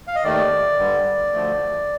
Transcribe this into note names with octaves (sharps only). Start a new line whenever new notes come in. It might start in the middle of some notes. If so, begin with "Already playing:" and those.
F5
D#5
D#2 D#3 A3 D5
G2 D3 G3
D2 D3 F3 A3